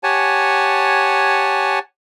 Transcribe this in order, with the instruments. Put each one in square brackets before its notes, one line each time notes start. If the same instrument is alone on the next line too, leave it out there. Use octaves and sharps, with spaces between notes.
[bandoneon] G4 C#5 F#5 G#5 A5